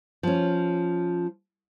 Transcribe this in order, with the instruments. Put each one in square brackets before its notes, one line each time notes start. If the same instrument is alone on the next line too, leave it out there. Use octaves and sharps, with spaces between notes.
[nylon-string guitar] F3 C#4